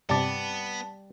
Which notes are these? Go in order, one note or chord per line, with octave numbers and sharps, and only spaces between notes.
G2 C3 G3 B3 D5 A5